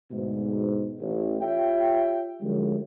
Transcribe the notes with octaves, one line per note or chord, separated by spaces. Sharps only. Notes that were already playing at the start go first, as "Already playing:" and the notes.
D2 G#2 B2
A1
F4 G4 C#5 E5 G5
F#2 A2 D3 F3 G3 G#3